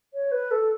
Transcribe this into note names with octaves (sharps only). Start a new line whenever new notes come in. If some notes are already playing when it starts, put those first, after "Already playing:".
C#5
B4
A4